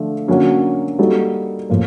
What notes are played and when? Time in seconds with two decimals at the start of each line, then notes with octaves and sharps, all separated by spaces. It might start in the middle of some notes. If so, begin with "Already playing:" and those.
Already playing: D3 F3 A3
0.28 D3 F#3 A#3 C#4 F#4
0.99 G3 A#3 D#4 F#4 A4
1.70 A2 F3 A#3